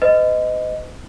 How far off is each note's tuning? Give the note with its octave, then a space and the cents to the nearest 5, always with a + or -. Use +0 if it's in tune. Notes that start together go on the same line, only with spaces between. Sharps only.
B4 +45 D#5 +0